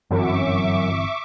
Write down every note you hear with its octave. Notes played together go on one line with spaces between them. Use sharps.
G1 F#2 E3 C4 E5 C#6 D6